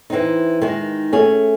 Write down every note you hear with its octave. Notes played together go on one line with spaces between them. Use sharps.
E3 C4 D#4
D#3 G#3 D#4
A3 C#4 G#4